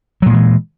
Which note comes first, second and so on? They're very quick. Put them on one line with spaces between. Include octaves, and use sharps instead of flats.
F#3 A#2 G#3 E3